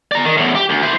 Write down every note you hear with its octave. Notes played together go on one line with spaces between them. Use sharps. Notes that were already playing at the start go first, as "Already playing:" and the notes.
D5 A#5
D#3
E2 A2
G4
D2
E4 C5